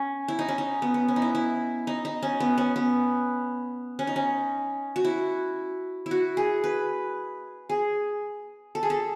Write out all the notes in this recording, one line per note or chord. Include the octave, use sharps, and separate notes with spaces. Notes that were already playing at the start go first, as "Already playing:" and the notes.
Already playing: C#4
E4
D#4
C#4
D#4
B3
B3
C#4
D#4
E4
E4
D#4
D#4
C#4
B3
C#4
B3
C#4
D#4
C#4
F#4
E4
E4
F#4
G#4
B4
G#4
A4
G#4
A4